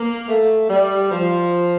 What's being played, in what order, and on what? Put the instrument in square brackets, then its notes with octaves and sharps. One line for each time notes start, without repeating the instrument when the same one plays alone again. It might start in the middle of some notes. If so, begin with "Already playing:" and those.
Already playing: [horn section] A#3
A3
G3
F3